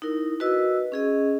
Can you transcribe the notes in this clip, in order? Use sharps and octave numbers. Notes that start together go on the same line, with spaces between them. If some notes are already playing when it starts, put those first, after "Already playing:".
D#4 E4 A#4
F#4 B4 D#5 E6
C#4 G#4 D#5